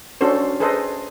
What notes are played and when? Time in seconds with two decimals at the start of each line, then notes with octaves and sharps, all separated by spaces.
0.21 C#4 D4 F#4 A4 C5
0.60 G#4 A4 B4 C5 D#5